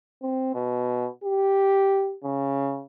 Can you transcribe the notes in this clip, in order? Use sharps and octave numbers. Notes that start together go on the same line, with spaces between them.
C4
B2
G4
C#3